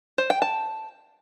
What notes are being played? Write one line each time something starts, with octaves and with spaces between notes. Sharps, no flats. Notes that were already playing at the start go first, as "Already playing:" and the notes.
C5
G5
A5